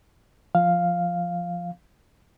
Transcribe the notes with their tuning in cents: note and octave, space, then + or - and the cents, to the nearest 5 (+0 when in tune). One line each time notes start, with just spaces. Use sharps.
F3 +0 F5 +0